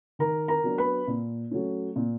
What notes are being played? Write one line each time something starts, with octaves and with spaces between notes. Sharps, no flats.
D#3 A#4 A#5
A#4 A#5
F#3 B3 D4
B4 B5
A#2
F#3 A3 C#4
A#2